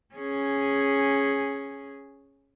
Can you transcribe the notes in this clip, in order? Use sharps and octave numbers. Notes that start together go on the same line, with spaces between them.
C#4 G#4